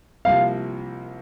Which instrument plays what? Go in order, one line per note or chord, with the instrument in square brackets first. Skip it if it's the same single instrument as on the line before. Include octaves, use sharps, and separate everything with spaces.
[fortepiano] C2 C3 F3 A#3 [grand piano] F5